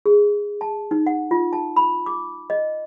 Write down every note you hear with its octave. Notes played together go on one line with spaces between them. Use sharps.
G#4
A5
D#4
F#5
F4
A5
B5
D6
D#5